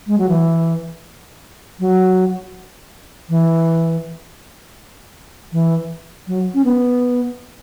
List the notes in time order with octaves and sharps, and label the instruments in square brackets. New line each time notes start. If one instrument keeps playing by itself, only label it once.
[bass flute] G#3
F#3
E3
F#3
E3
E3
F#3
C#4
B3